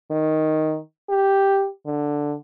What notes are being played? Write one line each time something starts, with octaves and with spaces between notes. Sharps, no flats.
D#3
G4
D3